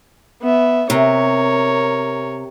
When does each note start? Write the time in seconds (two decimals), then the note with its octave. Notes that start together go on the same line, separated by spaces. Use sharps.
0.41 B3 E5
0.90 C3 A#4 C#5